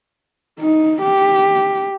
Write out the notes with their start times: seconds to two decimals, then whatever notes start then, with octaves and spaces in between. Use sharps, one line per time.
0.60 D#4
1.01 G4